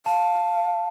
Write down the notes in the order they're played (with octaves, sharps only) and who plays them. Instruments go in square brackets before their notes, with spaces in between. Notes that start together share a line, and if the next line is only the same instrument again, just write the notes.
[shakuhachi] F5 [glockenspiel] A5